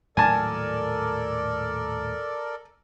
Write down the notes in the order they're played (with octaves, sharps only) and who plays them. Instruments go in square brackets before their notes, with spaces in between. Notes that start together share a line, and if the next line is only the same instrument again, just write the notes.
[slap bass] D#1 A2 F#3 [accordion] A4 A#4 D5 [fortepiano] G#5 A5